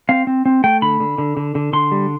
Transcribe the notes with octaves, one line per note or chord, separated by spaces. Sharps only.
C4 F5
C4
C4
A3 G5
D3 B5
D3
D3
D3
D3
D3 C6
G3